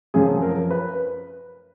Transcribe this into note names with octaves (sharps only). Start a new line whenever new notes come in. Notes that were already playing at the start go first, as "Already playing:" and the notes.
F#2 F3 G#4
A#4
B4